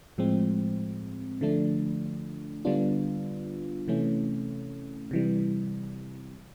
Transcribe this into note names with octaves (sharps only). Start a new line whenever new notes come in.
A2 F3 G#3 C4
D3 F3 A3 D4
D3 G3 B3 D4 F4
C3 E3 A3 C#4
C3 E3 G3